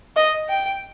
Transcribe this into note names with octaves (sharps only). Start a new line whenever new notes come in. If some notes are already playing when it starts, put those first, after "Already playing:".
D#5
G5